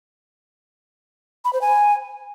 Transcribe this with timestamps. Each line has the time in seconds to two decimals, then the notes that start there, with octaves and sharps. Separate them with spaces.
1.45 B5
1.53 C5
1.61 G#5